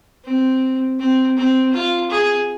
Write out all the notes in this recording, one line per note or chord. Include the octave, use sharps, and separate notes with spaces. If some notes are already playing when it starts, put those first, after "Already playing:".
C4
C4
C4
F4
G#4